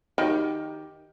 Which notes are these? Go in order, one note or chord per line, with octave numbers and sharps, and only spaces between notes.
D#3 D#4 G4